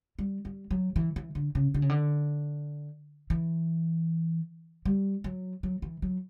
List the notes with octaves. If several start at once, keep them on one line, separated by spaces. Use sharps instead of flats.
G3
G3
F#3
E3
E3
D3
C#3
D3
C#3
D3
E3
G3
F#3
F#3
E3
F#3